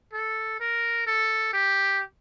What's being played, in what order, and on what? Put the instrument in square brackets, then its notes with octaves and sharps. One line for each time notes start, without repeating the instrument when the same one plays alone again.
[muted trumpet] A4
A#4
A4
G4